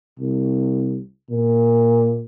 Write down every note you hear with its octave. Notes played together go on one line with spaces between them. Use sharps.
C2
A#2